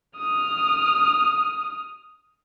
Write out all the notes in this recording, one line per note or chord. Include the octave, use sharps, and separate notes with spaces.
D#6 F6